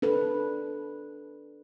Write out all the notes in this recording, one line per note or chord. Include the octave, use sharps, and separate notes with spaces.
D4 A4 B4